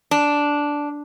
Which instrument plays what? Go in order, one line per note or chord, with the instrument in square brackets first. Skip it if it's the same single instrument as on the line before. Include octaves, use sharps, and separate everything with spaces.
[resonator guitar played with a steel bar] D4